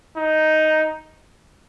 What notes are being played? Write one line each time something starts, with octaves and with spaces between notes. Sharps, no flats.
D#4